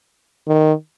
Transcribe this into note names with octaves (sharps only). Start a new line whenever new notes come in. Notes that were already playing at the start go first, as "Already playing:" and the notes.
D#3